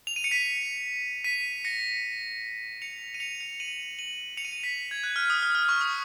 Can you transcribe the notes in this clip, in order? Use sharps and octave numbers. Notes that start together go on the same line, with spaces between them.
F7
D#7
C#7
B6 D#7
B6 D#7
A#6 C#7
C#7 F7
D#7
C#7 F7
C#7 F7
D#7 F#7
D#7 F#7
C#7 F7
D#7
C#7 F7
B6
G#6
F#6
F6
D#6
F6
F6
C#6
D#6